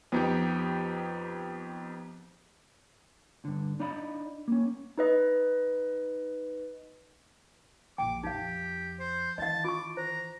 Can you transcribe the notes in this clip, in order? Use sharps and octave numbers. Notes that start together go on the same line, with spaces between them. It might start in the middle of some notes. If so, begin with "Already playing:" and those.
F2 B3 D#4 G4
G2 D3
D4 D#4 D5 D#5 F5 B5
A#3 C#4
D#4 B4 D#5
A#1 F2 G5 D6
F2 D#4 G4 F5
C5
D#3 E3 D#5 F5 A5
F4 C#6 D6
C5 A#5